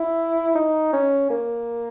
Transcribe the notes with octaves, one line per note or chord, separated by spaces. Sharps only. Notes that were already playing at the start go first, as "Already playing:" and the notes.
Already playing: E4
D#4
C#4
A#3